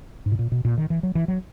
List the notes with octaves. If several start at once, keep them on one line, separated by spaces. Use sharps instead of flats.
G#2
B2
A#2
B2
A#2
D#3
E3
F#3
E3
F#3